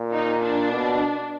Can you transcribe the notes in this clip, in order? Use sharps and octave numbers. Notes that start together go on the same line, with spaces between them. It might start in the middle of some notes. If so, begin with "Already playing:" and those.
Already playing: A#2
D#4
D4
B2